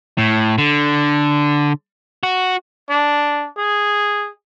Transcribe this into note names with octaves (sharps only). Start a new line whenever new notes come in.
A2
D3
F#4
D4
G#4